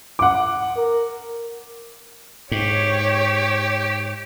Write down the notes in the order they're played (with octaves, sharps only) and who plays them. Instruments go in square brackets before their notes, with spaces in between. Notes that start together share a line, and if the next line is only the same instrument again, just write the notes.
[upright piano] F#5 D6
[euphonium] A#4
[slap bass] G#2 [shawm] G4 [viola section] C#5